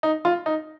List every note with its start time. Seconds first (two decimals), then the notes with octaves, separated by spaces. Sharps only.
0.03 D#4
0.25 F4
0.46 D#4